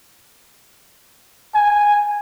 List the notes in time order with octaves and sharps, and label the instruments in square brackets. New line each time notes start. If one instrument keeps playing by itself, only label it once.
[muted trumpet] G#5